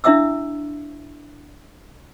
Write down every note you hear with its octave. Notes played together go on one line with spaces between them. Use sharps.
D4 E4 E5 F5 D#6 E6